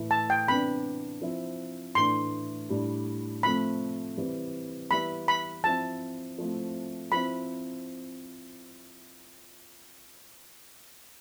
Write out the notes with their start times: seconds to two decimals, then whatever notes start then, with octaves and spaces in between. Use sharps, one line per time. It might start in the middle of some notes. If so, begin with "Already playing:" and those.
Already playing: A2 E3 A3 E4
0.11 A5
0.30 G5
0.48 C3 E3 B3 D4 B5
1.21 F3 C4 E4
1.95 A2 E3 A3 D4 C6
2.70 A2 G3 D4
3.43 C3 F3 A3 C4 B5
4.17 C3 E3 G3 C4 E4
4.91 E3 G3 B3 E4 B5
5.28 B5
5.64 F3 C4 E4 A5
6.38 F3 A3 C4 E4
7.12 F3 C4 E4 B5